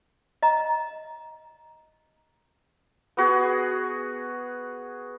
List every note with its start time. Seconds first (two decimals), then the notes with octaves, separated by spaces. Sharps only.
0.43 D#5 A#5
3.17 B3 F#4 G#4